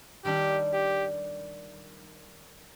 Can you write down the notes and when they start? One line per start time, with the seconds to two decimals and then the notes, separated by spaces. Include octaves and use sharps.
0.25 D#3 G3 D4 G4
0.73 G4